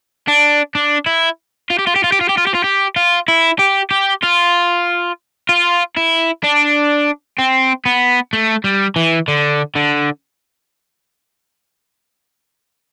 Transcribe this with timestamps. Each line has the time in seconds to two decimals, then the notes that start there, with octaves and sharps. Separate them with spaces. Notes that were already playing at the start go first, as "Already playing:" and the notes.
0.28 D4
0.75 D4
1.06 E4
1.70 F4
1.78 G4
1.87 F4
1.96 G4
2.04 F4
2.12 G4
2.21 F4
2.29 G4
2.38 F4
2.47 G4
2.55 F4
2.64 G4
2.96 F4
3.28 E4
3.59 G4
3.91 G4
4.23 F4
5.49 F4
5.97 E4
6.43 D4
7.39 C4
7.85 B3
8.33 A3
8.64 G3
8.96 E3
9.28 D3
9.75 D3